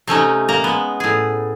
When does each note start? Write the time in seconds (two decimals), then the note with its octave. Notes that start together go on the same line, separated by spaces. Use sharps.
0.07 C3 A3 C#4 D#4
0.49 A#3 A#5
0.64 G#3 B3
1.00 A2 G#4